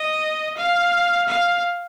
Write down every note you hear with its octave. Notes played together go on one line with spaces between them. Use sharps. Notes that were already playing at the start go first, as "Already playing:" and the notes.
Already playing: D#5
F5
F5